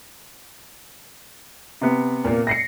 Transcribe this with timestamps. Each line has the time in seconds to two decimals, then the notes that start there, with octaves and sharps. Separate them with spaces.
1.81 C3 B3
2.24 A#2 A#3
2.47 A#6 C7 C#7